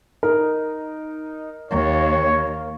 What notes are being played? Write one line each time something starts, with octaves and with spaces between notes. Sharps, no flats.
D#4 A#4
D#2 A#3 C#5